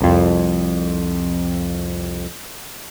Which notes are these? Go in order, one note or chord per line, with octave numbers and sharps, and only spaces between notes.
C2 F2